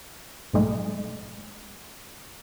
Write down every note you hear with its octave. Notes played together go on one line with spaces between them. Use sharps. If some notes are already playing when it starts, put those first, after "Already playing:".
B1 G#2 G#3 A3